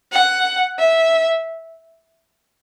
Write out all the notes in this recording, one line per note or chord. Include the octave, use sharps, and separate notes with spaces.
F#5
E5